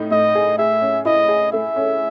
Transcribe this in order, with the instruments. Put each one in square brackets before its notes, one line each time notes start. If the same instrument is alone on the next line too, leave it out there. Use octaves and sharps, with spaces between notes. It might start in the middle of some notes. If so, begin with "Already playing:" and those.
Already playing: [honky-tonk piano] A2 D#4
[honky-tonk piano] A2 [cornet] D#5
[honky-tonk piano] G#4
[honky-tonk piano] G#4 [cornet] E5
[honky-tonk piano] C#4
[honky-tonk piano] E4 [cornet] D#5
[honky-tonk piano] G#4
[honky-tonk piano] A3 [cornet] E5
[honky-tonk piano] C#4